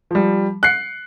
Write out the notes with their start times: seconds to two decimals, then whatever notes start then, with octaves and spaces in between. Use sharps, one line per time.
0.11 F3 G3
0.63 F#6 C7 C#7